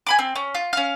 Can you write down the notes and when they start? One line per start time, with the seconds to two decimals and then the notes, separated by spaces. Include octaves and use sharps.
0.07 G#5 B5 D6
0.19 C4
0.36 C#4
0.55 F4
0.73 C#4 F5